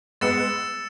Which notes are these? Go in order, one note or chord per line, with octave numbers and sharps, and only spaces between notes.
G#3 B3 E6 A6 C#7 E7